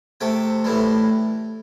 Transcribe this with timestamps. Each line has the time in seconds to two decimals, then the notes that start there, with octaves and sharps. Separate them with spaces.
0.21 C3 A3 G5
0.64 A2 E3 G3